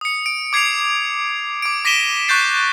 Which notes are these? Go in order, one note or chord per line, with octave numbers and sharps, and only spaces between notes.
D#6 C#7
D7
D6 G#6 C7 C#7 F7
D6 D7
D6 A#6 B6 D#7 E7 G7
C#6 F#6 G6 A6 C7